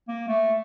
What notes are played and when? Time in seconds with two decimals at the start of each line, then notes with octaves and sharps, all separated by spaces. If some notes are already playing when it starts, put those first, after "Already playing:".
0.08 A#3
0.28 A3